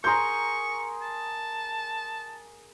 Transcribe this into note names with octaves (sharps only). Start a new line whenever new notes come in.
G#4 A#4 A#5 C6 C#6 G6
A5